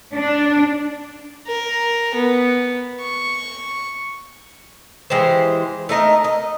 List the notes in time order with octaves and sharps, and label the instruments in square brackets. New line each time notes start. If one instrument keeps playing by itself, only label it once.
[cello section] D4
[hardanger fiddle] A#4
B3
C#6
[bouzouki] E3 G#3 G4 C5
A3 D#4 A#4 D#5
D#5